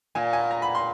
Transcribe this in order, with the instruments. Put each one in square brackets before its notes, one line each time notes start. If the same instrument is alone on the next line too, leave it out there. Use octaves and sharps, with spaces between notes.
[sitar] A#2 [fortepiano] G#5
[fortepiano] G#5
A#5
B5
C6